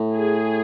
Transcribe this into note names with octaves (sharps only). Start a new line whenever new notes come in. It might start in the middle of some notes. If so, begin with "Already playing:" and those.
Already playing: A2
G#4